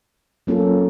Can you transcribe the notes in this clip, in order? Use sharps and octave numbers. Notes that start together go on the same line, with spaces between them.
F#3 A#3 C#4 F4 A4